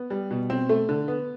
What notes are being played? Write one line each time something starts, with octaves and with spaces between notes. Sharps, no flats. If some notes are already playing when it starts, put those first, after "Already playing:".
Already playing: B3
G3
B2
C4
A3
D3
B3